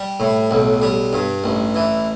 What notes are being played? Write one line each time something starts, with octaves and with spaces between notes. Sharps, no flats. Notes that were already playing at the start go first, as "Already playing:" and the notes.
Already playing: G3
A2
B1
G3
G2
A1
E3